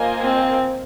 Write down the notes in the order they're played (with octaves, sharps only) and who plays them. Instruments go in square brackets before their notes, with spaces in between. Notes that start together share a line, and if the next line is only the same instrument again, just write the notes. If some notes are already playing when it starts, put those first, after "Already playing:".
Already playing: [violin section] A#3 F4 C5 D#5 G#5
[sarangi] C4